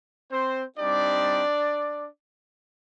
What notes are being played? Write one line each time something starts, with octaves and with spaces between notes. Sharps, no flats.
C4 C5
G3 C4 D4 D#4 G4 D5